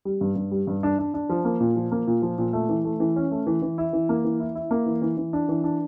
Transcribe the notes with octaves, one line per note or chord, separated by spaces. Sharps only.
G3
G2
G2
G3
G2
D4
D4
D4
F3
A#3
A#2
F3
A#3
A#2
F3
A#2
A3
E3
A3
E3
C#4
A3
E3
E3
E4
E3
A#3
E3
E4
E4
A#3
E3
E3
E3
D4
E3
D4